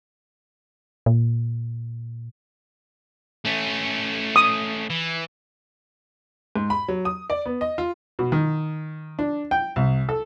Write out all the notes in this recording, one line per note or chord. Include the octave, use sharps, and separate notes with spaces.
A#2
A3 C#4
D#6
E3
G#2
B5
F#3
D#6
D5
B3
D#5
F4
B2
D#3
D4
G5
C2
A4